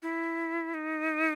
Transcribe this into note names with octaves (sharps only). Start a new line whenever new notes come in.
E4
D#4